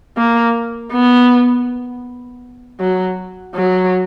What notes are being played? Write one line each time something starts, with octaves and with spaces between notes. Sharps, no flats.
A#3
B3
F#3
F#3